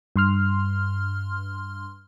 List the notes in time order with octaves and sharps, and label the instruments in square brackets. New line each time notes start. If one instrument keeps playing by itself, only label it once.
[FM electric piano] G2 C6 F6